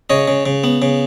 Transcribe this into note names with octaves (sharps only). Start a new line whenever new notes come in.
C#3 C#5 D#5
C#3
C#3
B3
C#3